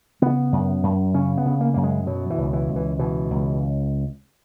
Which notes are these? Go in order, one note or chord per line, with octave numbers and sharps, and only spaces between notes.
C#3 B3
F#2
F#2
C#3 C#4
B3
C#3
A#3
F#2 A#3
G#3
B2 F#3
E3
C#2
E3
C#2
E3
B2 E3
C#2